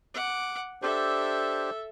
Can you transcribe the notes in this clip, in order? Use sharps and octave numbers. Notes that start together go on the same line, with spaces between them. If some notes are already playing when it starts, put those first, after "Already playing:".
F#5 D6
D4 G4 A4 C5 E5